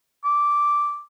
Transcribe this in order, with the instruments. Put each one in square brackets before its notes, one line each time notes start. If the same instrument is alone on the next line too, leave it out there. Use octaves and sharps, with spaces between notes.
[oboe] D6